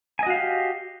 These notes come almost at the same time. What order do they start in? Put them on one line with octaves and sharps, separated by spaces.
G#5 D#5 F#4 F5 G4